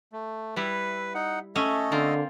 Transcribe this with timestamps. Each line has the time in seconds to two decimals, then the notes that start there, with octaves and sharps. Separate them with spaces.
0.13 A3
0.56 G3 E4 B4
1.14 D#4 F#5
1.55 A3 C#4 A4 D#5 E5 G#5
1.92 D3 A#3 C4 F4